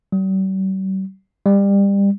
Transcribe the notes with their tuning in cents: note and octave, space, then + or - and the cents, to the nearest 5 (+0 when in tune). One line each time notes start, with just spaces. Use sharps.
G3 -45
G3 +25